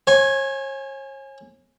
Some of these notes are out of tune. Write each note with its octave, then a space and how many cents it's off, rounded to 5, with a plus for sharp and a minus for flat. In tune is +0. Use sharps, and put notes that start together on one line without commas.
C#5 -40 G#5 +0